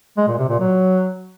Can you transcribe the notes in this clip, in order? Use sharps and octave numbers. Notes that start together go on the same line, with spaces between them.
G#3
A#2
C3
A#2
F#3